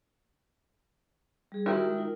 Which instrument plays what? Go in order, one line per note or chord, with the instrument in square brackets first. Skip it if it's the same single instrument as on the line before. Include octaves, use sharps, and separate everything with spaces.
[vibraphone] G3 G#4
[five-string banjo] D#3 E4 [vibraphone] F#4 G4
[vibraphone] G#3
D#4 F4 A#4